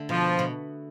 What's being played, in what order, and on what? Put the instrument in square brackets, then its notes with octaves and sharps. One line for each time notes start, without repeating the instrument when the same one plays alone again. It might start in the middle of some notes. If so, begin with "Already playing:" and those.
Already playing: [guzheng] D3 A3
[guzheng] B2 [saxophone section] F3
[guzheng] B2